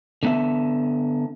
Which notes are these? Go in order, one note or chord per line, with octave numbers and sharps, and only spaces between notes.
D3 B3 E5